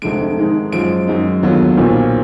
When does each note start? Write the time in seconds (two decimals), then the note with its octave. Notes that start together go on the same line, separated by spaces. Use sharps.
0.02 F1 F2 D3 G#3 D7
0.37 G#2 D#3 G#3 D#4
0.72 F#2 F3 G#3 D7
1.07 F#2 D#3 G#3 D#4
1.43 D#2 D3 F#3 B3 F4
1.77 B1 A#2 F3 A#3